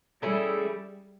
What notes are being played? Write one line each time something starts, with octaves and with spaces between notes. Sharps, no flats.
G3 A3 C#4 E4 G#4